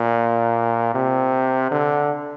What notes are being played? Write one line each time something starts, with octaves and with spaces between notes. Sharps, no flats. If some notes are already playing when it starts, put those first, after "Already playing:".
Already playing: A#2
C3
D3